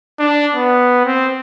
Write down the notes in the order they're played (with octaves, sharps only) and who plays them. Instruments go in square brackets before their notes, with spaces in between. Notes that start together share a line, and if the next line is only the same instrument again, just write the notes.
[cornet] D4
B3
C4